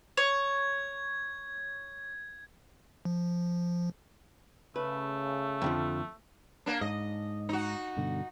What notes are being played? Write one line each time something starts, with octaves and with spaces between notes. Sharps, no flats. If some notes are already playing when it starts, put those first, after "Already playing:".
C#5 G#6
F3
C#3 A3 B4
F2 D3 F3
A#3 D4
G#2 D#5
D#4 F#4
G2 B2 D3